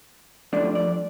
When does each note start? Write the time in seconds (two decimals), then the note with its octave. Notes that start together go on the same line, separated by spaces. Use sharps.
0.53 G2 F3 A3 D4 D5
0.75 D5